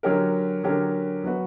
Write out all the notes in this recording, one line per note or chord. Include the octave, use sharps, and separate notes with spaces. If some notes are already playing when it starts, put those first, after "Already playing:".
D3 F#3 C#4 G4 A#4
D3 F#3 C#4 G4 A#4
F#3 B3 F#4 B4